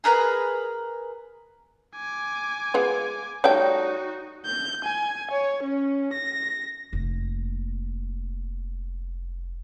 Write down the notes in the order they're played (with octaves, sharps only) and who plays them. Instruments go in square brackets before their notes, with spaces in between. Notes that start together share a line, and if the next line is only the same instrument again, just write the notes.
[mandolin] G#4 A#4 B4 A#5
[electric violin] G#5 D6
[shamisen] G#3 B3 F4
[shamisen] G3 A3 G5 [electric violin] D#4 F#4 [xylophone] C#5 D5 G6
[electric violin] G6
G#5
C#5
C#4
A#6
[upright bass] F1 A#3